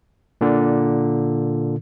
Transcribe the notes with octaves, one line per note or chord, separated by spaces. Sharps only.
A#2 D3